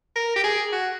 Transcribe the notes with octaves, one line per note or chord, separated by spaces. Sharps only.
A#4
G4
G#4
F#4